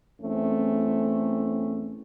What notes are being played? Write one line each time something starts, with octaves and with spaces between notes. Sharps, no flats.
E2 A3 C4 C#4